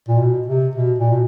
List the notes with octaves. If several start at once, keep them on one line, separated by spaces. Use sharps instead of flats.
A#2
B2
C3
B2
A#2
B2